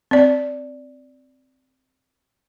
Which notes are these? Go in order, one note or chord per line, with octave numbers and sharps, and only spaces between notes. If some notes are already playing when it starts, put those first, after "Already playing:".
C4 D5